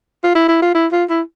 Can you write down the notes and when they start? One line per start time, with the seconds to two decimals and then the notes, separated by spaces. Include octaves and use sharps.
0.24 F4
0.35 E4
0.48 E4
0.62 F4
0.75 E4
0.92 F4
1.10 E4